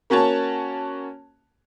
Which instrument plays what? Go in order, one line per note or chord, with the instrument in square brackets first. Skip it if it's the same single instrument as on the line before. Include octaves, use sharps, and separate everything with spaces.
[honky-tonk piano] A#3 C#4 F#4 C#5 A5